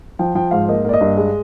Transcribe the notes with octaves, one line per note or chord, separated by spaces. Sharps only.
F3 G5
F3 G5
G#2 F5
A#3 D#5
A#3 D5
D#5
G2
G#3